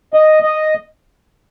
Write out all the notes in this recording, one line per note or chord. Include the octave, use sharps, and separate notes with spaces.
D#5
D#5